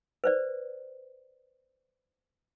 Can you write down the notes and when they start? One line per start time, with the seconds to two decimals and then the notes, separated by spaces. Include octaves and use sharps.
0.24 B4 C5 D5